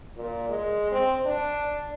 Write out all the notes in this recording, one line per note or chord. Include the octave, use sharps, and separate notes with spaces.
A#2
G#3
C4
D4